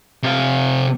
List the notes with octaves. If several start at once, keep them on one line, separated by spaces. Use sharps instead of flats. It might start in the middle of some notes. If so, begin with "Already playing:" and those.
C3 F5